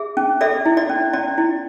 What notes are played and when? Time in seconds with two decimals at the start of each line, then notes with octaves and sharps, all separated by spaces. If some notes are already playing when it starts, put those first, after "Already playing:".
Already playing: G#4 E5
0.17 C#4
0.41 A4 D5 E5
0.66 E4
0.77 D5
0.90 C#4
1.13 C#4 D5
1.38 E4